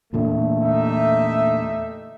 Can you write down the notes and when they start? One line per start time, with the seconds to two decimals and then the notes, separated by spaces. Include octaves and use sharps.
0.13 E2 A#2 D3 A3
0.63 G3 D#4 E5